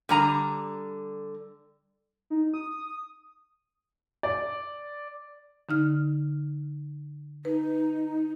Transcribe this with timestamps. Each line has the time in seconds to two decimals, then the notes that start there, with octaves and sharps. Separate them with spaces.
0.09 D3 G3 A#5
2.30 D#4
2.54 D#6
4.23 D5
5.69 D3 D#4 F6
7.45 D#4 B4